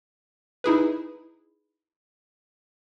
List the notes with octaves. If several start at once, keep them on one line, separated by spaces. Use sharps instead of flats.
D#4 E4 G#4 B4